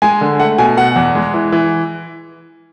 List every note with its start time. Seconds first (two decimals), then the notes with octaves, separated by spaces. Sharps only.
0.02 G#3 G#5
0.21 D3
0.40 A3 F#5
0.58 B2 G#5
0.77 B2 F#5
0.96 E2
1.15 G#3
1.34 E3
1.52 E3